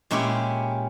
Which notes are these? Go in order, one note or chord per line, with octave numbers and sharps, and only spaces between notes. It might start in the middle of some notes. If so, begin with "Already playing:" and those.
A#2 G#3 C#4 E4 G4